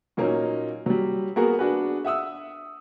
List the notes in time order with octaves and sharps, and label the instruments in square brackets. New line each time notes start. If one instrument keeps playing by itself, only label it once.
[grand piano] A#2 F#3 A#3 C#4 D#4
F#3 G3
A#3 B3 F#4 G#4 A#4
D4 F#4 G#4 B4
E5 F#5 D#6 E6